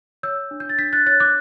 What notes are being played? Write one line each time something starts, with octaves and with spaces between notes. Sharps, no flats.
C#5 E6 G6
D4
G6
A6
D4 G6 B6
F#6 A6
C#5 F#6 A6
D6 F#6